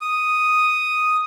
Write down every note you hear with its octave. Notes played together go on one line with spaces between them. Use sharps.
D#6